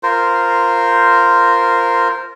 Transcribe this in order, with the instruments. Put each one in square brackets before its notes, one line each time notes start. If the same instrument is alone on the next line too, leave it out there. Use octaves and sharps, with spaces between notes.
[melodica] F4 A#4 C5